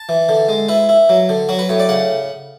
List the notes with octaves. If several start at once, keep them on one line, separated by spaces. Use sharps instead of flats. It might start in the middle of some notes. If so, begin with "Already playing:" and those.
Already playing: A5
E3
D3
G#3
E4 B4
E4
F#3
D3
F#3 F#4
B4
A2 C#5
D5
C#3 F#5